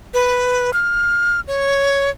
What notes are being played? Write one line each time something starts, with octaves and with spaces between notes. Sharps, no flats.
B4
F6
C#5